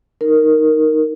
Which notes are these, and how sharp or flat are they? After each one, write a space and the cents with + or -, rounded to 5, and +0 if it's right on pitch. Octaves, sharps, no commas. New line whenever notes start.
D#4 +0 A#4 +0